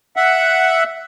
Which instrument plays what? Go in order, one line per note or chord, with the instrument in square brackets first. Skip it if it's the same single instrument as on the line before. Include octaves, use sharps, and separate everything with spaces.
[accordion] E5 F#5